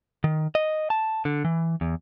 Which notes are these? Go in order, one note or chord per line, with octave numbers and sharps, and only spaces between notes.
D#3
D#5
A5
D3
E3
E2